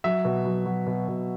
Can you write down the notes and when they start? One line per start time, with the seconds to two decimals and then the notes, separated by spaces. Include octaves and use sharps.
0.04 F#3 E5
0.25 B2
0.45 F#3
0.66 F#3
0.87 B2
1.08 B2